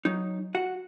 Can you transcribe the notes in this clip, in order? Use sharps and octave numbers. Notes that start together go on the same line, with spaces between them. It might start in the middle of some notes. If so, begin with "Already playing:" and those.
F#3 D#4
F#4 F#5